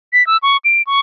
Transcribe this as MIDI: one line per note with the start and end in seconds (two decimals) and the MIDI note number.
0.13 0.26 95
0.27 0.37 88
0.43 0.57 85
0.65 0.82 98
0.87 1.00 85